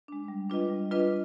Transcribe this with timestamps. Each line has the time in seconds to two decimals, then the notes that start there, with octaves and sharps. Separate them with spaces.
0.08 G#3 D4
0.28 G3
0.49 D4 F4 B4 D#5
0.70 G3
0.91 D4 F4 B4 D#5